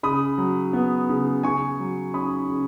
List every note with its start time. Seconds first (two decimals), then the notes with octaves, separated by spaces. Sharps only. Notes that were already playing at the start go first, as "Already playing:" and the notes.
0.03 C#3 B5 D#6
0.38 F#3
0.73 B3
1.09 C#3
1.43 C#3 G#5 C#6
1.80 F#3
2.14 C#4 B5 D#6
2.50 C#3